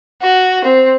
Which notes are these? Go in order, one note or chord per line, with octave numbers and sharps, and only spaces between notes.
F#4
C4